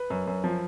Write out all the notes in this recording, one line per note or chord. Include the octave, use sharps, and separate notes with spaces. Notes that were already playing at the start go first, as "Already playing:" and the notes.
Already playing: B4
F#2
F#2
F3